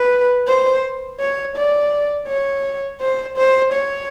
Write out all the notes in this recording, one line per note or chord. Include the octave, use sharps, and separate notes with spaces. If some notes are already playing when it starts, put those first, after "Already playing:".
Already playing: B4
C5
C#5
D5
C#5
C5
C5
C#5